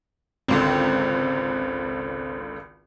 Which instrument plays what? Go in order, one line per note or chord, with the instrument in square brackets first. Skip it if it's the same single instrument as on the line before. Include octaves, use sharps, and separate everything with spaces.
[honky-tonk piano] G#1 C#2 D3 [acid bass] C4